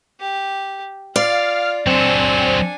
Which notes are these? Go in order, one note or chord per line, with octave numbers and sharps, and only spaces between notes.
G4
F4 D5 F5
F#3 C4 D4 A4 G#5